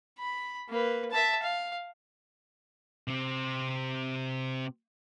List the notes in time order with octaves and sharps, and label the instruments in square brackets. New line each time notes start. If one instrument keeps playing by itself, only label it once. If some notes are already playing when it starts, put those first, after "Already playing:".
[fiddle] B5
A#3 B4
E5 A5
F5
[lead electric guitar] C3 C4